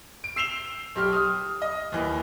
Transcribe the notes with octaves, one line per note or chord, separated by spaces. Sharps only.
D7
E6 C7 E7 F7 G7
B1 G4 F6
D#6 F6
D#5
D#2 E3